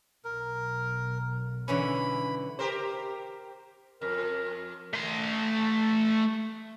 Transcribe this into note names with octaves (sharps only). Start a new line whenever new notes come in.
B1 A#4
D3 E3 C#4 B5
G4 A#4 C5
F2 A#4
A3 C6